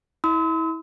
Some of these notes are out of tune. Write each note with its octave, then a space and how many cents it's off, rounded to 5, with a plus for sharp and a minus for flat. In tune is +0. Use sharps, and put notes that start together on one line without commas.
E4 -30 C6 -40 E6 -45